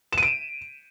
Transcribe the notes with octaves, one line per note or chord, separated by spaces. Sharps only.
E7
D#7
D7